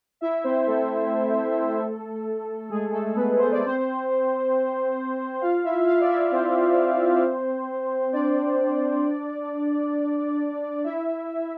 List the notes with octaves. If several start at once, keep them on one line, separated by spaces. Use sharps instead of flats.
E4 E5
C4 C5
A3 A4
G#3 G#4
A3 A4
B3 B4
C5
D5
C4 C5
F4 F5
E4 E5
F4 F5
D5
E4 E5
C4 C5
D4 D5
E4 E5